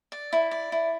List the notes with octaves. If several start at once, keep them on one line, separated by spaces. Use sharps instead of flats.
D5
E4
D5
E4